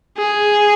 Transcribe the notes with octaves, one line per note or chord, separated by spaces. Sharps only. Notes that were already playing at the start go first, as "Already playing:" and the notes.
G#4